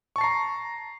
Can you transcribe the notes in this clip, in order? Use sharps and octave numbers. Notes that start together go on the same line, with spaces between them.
A5 A#5 C#6 C7